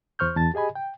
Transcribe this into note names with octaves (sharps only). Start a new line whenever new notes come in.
E2 C5 C#6 F6 G6
E2 A5 A6
G4 G#4 D#5 G#5 B5
G5